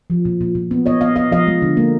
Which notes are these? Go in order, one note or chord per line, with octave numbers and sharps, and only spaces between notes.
F3
A#2
A#2
A#2
B3
B3 C#5 D#5
B3 D#5 F5
B3 D#5 F5
F3 D#5 F5
G#3
D3
A#3